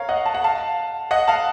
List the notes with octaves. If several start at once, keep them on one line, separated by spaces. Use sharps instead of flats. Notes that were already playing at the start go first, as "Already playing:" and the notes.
Already playing: A#4 C#5 F5
D#5 F#5
A5
F#5
F5 A5
D#5 F#5
F5 A5